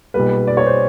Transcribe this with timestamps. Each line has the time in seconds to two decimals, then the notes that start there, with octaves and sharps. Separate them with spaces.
0.14 B1 A#2 G3 B4
0.47 D5
0.57 C#5
0.66 C5